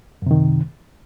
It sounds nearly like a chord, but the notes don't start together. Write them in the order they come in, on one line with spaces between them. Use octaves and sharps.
F#2 C3 D#3